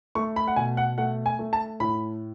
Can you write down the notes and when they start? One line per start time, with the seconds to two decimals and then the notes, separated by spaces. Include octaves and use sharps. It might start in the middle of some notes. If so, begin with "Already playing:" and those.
0.15 A3 C#6
0.36 B5
0.48 F#5
0.56 B2 G#5
0.77 F#5
0.98 A3 F#5
1.26 G#5
1.39 A3
1.53 A5
1.80 A2 B5